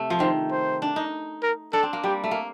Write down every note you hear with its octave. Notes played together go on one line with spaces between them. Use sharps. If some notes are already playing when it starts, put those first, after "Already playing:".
Already playing: C3 A3
F3
D#3 C5
C5
D4
D#4
A#4
D4 A4
C4
A#3
G3 G4
A3
A#3